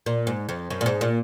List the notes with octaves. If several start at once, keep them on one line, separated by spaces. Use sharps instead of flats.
A#2
G#2
F2
F#2
A#2
G#2
A#2